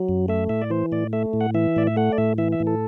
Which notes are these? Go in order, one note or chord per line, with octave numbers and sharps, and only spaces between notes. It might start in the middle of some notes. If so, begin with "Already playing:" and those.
Already playing: F#3
F#2
A3 E5
A2 E5
D5
E3 C5
A2 D5
A3 E5
A2
F#5
E3 E5
A2 D5
E5
A3 F#5
D5
A2 E5
E3 E5
E5
A2
A4